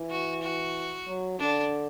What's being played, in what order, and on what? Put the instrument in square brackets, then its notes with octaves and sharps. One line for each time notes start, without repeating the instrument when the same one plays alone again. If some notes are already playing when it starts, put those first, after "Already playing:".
Already playing: [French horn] E3
[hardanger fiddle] F#4
F#4
[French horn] F#3
[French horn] D3 [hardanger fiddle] D4